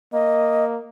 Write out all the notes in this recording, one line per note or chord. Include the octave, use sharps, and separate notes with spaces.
A#3 D#5